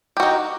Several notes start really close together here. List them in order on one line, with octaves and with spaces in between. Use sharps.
G4 F#4 D#4